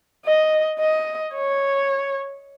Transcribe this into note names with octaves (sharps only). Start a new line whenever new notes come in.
D#5
D#5
C#5